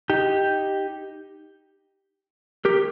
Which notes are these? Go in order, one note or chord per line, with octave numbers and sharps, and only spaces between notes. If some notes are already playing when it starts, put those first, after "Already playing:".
D#4 G4
G4 A#4